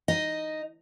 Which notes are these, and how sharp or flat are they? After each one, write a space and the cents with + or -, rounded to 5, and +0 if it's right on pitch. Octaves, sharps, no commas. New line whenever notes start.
D#4 +0 D#5 +0